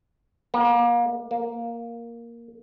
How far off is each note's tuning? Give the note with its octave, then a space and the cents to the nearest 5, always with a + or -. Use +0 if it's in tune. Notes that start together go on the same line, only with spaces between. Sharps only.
A#3 +35
A#3 +5